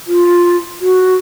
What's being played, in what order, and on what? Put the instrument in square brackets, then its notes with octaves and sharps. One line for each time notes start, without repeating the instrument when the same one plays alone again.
[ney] F4
F#4